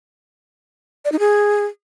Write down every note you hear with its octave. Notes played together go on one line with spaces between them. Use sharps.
D5
D#4
G#4